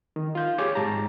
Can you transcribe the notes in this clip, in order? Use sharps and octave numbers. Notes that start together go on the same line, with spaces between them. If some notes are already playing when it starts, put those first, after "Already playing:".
D#3
F4 G6
G4 G#4 C#5 G5 D6
G#2 A5 A#5